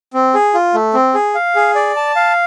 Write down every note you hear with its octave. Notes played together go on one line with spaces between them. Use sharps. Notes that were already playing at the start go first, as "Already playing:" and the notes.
C4
G#4
F4
A3
C4
G#4
F5
G#4
D5
A5
F5